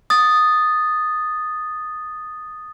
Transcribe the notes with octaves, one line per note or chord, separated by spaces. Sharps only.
D#6 A6